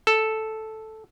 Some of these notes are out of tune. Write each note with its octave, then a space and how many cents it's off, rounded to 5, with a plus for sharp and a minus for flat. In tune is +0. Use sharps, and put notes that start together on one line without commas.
A4 -5